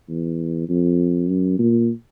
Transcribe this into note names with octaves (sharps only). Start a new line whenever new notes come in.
E2
F2
F#2
A#2